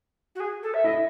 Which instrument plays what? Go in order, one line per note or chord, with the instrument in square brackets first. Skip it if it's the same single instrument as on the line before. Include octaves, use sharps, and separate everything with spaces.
[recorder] F#4
G#4
A4
E5
[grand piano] E4 [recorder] D#5